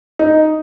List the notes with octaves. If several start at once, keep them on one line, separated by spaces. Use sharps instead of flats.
D#4